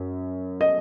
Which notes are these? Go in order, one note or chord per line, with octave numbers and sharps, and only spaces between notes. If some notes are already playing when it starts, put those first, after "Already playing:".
Already playing: F#2
D#5